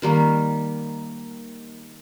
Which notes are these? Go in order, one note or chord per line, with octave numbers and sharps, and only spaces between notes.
D#3 G3 A#3